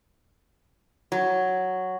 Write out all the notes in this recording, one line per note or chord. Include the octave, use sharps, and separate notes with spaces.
F#3